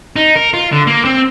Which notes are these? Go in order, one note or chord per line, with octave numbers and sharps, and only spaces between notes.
D#4
A#4
F4
D3
A#3
C4